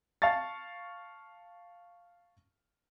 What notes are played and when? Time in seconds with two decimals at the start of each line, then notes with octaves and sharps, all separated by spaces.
0.22 F5 A5 C#6 A6